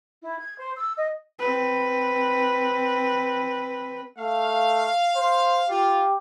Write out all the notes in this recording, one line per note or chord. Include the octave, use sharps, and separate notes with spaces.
E4
G#6
C5
E6
D#5
C4 B4
A3 F5
C5
F4 G4